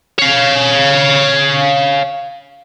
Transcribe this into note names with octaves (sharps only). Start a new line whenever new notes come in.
C#5 F5